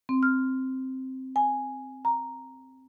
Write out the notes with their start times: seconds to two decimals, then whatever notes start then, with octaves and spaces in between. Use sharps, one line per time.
0.09 C4
0.23 F6
1.36 G#5
2.05 A#5